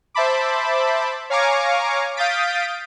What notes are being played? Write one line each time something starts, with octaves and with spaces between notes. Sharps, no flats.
C5 E5 A5 B5 D6
C#5 F5 G#5 A#5 C#6 D6
F5 D#6 G6 A6 B6 D7